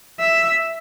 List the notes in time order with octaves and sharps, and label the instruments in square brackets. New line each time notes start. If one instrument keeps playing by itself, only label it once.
[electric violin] E5